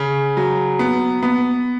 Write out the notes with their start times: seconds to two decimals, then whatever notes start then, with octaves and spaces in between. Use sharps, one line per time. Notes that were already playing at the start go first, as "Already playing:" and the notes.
Already playing: C#3
0.37 F#3
0.79 B3
1.23 B3